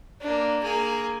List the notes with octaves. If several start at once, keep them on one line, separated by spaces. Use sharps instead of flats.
A#3 D4
A#3 G#4